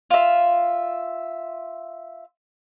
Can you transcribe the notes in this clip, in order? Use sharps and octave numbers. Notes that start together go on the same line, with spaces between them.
F4 E5